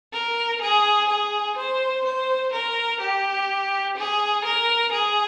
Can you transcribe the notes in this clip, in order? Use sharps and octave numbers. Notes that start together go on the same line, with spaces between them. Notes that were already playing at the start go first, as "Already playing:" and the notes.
A#4
G#4
G#4
C5
C5
A#4
G4
G#4
A#4
G#4